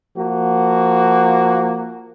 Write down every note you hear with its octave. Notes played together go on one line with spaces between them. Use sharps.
F3 A#3 F#4